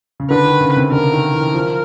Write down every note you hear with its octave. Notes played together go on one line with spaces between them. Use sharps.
C#3
D3 B4
D#3
C#3
C3
D3 A#4
D#3
E3
F3